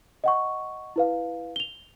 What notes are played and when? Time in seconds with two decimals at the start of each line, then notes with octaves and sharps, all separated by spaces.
0.24 D#5 F#5 C#6
0.96 E4 B4 F5
1.56 F7 G7